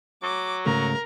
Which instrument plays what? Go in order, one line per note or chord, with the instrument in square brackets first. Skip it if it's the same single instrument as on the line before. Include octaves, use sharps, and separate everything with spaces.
[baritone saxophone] F#3 [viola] D6
[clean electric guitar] G#2 C#3 A3 [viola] A#4